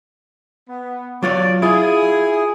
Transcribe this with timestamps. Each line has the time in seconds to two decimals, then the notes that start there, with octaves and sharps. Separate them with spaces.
0.69 B3
1.23 F#3 F4 C#5 D5
1.62 E4 F4 G#4